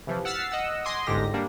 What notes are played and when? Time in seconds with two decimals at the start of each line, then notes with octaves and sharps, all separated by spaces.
0.07 C3 E3 F3
0.25 F#5 E6 F6 A6 B6 C7
0.50 D#5 F#5 E6
0.85 D#5 G#5 C6 D6 D#6
1.06 G1 C#2 G#2 D3 G4 A#6
1.34 G3 A#3 D4